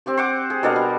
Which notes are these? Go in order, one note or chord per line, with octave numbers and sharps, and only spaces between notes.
C4 G4 D5
C5 F#5 D6
G#4
B2 D4 A4 A#4 D#5 F#5
G3